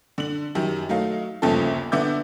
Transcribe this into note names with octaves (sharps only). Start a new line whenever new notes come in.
D3 F#7
F#2 D#3 G4
F#3 A3 D#4 F5
G1 D#2 C#3 F3 A4
D3 B3 E5 D6 G6